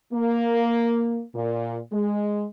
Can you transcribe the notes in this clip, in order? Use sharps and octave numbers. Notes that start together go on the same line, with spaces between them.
A#3
A#2
G#3